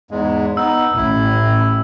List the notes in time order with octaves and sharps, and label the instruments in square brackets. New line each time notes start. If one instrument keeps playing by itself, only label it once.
[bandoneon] E2 G#2 G#3
[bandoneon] B3 D#4 [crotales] E6
[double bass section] A1 [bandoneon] E4